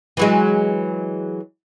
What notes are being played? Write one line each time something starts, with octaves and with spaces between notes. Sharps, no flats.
E3 F#3 G#3